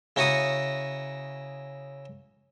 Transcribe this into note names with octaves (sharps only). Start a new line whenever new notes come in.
C#3 E4 F#4 A#5 C#6 D#6